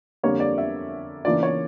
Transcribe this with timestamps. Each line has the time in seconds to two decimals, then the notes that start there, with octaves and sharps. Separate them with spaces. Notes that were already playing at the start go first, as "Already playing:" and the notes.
0.23 F2 D3 G3 A#3 C#5
0.40 D5
0.58 E5
1.25 C#3 E3 A#3 D4 F4 D5
1.43 C#5